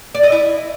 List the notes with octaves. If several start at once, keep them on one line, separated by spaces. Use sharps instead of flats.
D5
D#5
E4